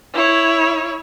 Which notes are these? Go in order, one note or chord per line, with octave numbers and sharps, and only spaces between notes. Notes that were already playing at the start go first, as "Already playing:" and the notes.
E4 C#5